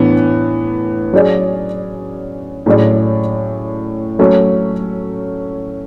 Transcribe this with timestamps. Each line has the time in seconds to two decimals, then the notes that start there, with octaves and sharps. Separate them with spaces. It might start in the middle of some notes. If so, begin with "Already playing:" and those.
Already playing: A2 E3 B3 D4
1.13 F#3 C#4 G#4 D5
2.66 A2 F#3 C#4 G#4 D5
4.19 F#3 A3 C#4